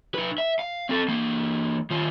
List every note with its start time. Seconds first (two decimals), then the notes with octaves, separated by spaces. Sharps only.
0.14 D#4 B4
0.38 E5
0.59 F5
0.89 C4 A4
1.08 E3 A#3
1.90 D#3 F4